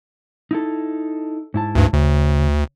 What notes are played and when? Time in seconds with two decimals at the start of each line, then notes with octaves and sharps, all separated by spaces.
0.51 D#4 E4 A4
1.54 G#2 E4 A5
1.75 D2 G2
1.93 D2 C#3